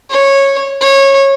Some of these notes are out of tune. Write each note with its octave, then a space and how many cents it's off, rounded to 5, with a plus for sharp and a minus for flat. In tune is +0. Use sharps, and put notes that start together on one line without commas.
C#5 -10
C#5 -20